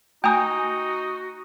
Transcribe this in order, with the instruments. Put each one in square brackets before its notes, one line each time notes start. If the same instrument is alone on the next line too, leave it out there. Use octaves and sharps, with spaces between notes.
[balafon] A3 G#5 A#5 [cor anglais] D#4 [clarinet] F#4 [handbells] G5 D#6 G6